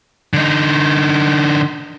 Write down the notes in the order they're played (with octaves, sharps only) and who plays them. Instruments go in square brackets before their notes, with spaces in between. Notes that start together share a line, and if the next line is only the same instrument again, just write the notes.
[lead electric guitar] D3 D#4